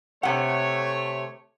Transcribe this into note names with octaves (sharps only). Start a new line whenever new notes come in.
C3 A3 C#5 F#5